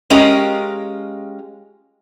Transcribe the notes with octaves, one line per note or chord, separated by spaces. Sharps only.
G#3 C#4 F4 G4 A#4 D#5